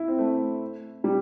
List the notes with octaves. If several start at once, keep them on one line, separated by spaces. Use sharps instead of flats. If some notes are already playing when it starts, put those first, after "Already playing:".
Already playing: E4
C4
A3
G3